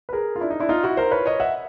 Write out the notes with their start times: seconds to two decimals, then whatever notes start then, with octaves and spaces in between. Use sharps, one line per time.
0.09 B4
0.13 G#4 A#4
0.36 F4
0.41 D4 E4
0.50 D#4
0.60 D4 E4
0.69 D#4 F4
0.84 E4 F#4
0.97 A#4 C5
1.11 B4 C#5
1.26 C#5 D#5
1.40 E5 F#5